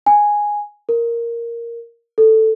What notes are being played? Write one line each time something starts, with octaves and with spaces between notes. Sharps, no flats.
G#5
A#4
A4